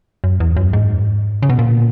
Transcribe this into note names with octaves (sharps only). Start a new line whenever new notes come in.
F#2
E2
F#2
G#2
C#3
B2
A#2